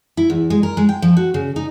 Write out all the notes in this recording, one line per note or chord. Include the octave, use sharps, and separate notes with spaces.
E4
E2
G#3
A#4
G#3
G5
F3
F#4
C#3
D#4